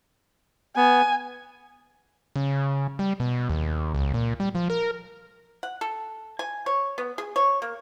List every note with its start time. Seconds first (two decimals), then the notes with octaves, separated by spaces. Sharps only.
0.76 B3 G#5
2.36 C#3
2.99 G3
3.20 B2
3.49 D#2
3.94 C#2
4.14 A#2
4.40 G3
4.55 F3
4.70 A#4
5.63 F#5
5.81 A4
6.39 G#5
6.66 C#5
6.98 B3
7.18 G#4
7.36 C#5
7.62 A#3